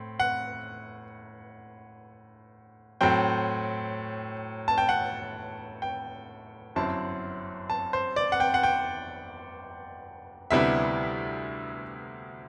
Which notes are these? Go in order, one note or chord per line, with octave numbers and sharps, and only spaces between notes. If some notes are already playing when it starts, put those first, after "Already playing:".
Already playing: A2 C4
F#5
A2 F#3 C4 G5
A5
G5
F#5
G5
G1 F#2 F#3 C4 E4 A5
A5
C5
D5
F#5
G5
F#5
G5
D2 C3 G3 B3 E4 E5